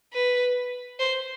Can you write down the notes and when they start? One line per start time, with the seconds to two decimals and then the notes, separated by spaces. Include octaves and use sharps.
0.13 B4
0.99 C5